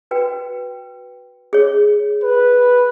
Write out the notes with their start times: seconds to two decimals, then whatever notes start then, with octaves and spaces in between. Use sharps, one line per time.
0.11 F#4 B4 G5
1.53 G#4 C#5
2.23 B4